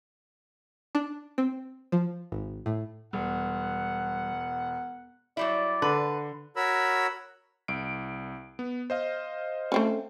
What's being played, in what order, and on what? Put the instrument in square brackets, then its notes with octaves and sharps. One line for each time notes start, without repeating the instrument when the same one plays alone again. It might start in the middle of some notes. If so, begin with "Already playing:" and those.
[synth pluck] D4
C4
F3
G#1
A2
[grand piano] E1 [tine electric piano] G3 [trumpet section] F#5
[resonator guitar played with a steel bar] F#3 G3 E4 [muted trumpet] D5
[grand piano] D3 [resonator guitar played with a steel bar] B4
[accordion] F#4 A#4 C#5 B5 E6
[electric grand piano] C2 D7
B3
C5 D#5 F5
[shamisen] A3 C4 C#4